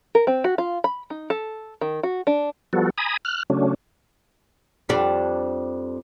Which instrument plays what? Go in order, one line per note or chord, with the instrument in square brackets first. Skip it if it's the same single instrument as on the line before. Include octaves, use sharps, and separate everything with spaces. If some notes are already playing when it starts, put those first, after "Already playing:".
[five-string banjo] A#4
C4
F#4
F4
B5
D#4
A4
D#3
F#4
D4
[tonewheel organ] F3 G3 B3 F#4 A4
G#5 A#5 B5 D#6
F6 F#6
C#3 F#3 A3 C#4 D4
[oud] F2 G3 D4